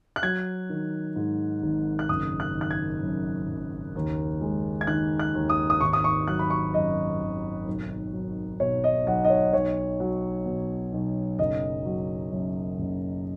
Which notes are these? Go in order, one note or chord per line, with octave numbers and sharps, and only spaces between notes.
F#6
F#3 G#6
D#3
G#2
G#1
F#6
F#1 D#6
F#6
D#3
F#6
G#6
F#2
F#1
D#2
G#3
G#6
D#3 F#6
F#6
D#2
D#6
D#6
G#1 C#6
D#6
C#6
F#3 F#6
B5
C#6
F#2 D#5
G#1
B1
F#3
B2 C#5
D#5
B1 F#5
D#5
C#5
B1 C#5
F#3
B2
B1
F#1 D#5
F#3
F#2
F#1